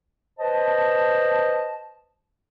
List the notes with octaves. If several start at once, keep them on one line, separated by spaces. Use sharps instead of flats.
B4 C5 D#5 A5